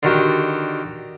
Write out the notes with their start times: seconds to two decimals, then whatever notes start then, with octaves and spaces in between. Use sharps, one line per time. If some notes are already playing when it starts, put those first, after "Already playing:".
0.03 D3 D#3 F#4 G4